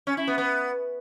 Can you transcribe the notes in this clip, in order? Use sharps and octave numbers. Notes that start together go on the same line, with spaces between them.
C#4
E4
B3
B3